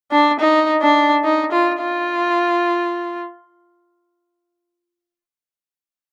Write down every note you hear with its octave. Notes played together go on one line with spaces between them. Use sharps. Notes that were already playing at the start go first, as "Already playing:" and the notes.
D4
D#4
D4
D#4
F4
F4